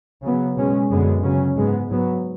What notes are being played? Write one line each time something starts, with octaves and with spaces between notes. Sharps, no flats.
C#3 F#3 B3
B2 G#3 C#4
F#2 D3 G#3 B3
C#3 F#3 C#4
G#2 G#3 B3
G#2 F#3 B3